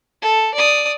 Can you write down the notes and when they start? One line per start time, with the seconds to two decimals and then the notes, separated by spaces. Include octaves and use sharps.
0.22 A4
0.54 D5 D#6